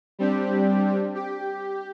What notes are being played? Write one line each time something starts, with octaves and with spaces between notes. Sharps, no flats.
G3 C4 D4 G4
G4